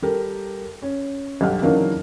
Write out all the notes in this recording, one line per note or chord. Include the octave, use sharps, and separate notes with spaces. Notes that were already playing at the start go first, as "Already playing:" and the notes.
G3 G4 A4 A#4
C#4
B1 G2 G4 A4 F#5 F6
C#3 E3 F#3 A#3 D4 D#4